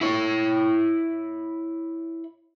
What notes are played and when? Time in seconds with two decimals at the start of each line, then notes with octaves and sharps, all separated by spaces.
0.01 E4 C#5